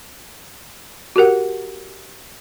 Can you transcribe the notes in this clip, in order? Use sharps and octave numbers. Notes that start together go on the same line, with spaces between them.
F#4 G4 A#4 F#5